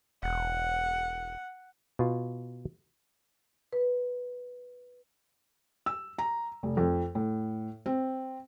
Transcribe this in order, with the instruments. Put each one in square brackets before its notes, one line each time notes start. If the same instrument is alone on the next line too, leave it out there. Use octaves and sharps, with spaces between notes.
[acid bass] E1 [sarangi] F#5
[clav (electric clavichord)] B2 F4
[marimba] B4
[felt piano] E6
A#5
F1
F2
A2
C4